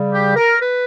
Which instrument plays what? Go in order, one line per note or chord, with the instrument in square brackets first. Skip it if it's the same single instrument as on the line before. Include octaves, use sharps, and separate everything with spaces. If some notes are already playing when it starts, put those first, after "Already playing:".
Already playing: [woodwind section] C#3 G3
G4
A#4
B4